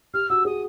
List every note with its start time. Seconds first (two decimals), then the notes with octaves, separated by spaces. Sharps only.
0.14 G4 F6
0.29 F#4 E6
0.45 G#4 D#6